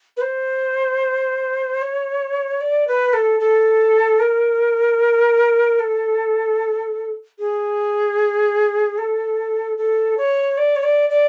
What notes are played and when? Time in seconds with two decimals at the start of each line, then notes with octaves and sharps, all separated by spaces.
0.17 B4
0.21 C5
1.82 C#5
2.61 D5
2.88 B4
3.13 A4
3.40 A4
4.20 A#4
5.80 A4
7.39 G#4
8.98 A4
9.78 A4
10.18 C#5
10.58 D5
10.76 C#5
10.83 D5
11.10 D5